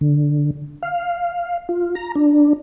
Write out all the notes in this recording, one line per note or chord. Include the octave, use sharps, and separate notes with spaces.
D3
F5
F4
A#5
D4